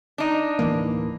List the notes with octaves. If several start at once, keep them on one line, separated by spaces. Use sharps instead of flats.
D4 D#4
D1 E3 A#3